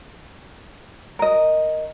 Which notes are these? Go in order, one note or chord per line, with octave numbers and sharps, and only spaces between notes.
A#4 D#5